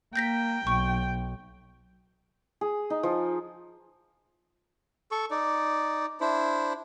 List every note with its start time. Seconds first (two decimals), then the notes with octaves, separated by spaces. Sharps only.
0.16 A#3 G5 G6 A#6 B6
0.67 B1 C#6
2.61 G#4
2.90 D#4
3.03 F3
5.11 A4 C#6
5.31 D#4 D5
6.21 D4 E4 C5